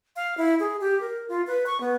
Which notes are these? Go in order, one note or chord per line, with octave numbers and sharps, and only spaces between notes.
F5
E4
G#4
G4
A#4
F4
B4
C#6
B3